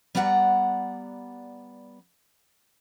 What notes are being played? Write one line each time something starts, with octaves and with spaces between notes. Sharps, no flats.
G3 B3 D5 F#5 A#5